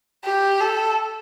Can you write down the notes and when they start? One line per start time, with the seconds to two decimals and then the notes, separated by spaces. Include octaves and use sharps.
0.24 G4
0.60 A4